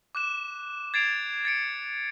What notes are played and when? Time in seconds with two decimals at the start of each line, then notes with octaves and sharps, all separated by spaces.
0.15 D6 F#6 E7
0.94 G#6 A6 C7 D7 F7
1.45 A6 C#7 D7